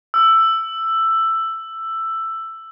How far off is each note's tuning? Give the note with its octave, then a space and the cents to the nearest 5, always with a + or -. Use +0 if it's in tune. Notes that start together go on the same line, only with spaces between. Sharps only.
E6 +10